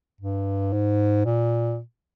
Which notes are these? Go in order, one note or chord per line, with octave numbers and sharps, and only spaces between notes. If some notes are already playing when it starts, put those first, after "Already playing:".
G2
G#2
A#2